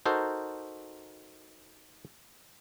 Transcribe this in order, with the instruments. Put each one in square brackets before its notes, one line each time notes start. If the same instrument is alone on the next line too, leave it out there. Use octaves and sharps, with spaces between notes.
[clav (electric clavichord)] D#4 F#4 A4 A#4 C5